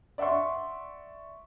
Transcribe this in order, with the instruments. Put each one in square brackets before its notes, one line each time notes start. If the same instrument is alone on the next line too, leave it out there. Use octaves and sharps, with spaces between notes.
[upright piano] D5 E5 F#5 C6 C#6